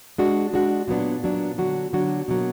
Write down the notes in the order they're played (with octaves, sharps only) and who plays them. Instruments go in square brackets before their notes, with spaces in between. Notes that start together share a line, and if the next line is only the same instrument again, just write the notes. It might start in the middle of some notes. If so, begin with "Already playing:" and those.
[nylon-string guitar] G#3 D4 F#4
G#3 D4 F#4
A#2 F#3 B3 D4
A#2 F#3 B3 D4
D3 F#3 D4 F#4
D3 F#3 D4 F#4
B2 F#3 A#3